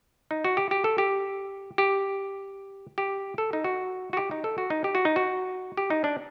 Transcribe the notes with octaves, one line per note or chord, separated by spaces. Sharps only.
D#4
F#4
G4
G4
A4
G4
G4
G4
A4
D#4
F#4
F#4
G4
D#4
A4
F#4
D#4
G4
F#4
D#4
F#4
G4
D#4
D4